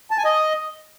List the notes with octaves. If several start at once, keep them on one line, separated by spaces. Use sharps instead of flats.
A5
G#5
D#5